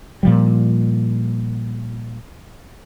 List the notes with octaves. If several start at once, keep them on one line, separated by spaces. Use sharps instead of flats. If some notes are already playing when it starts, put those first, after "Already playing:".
A#2 F3 G3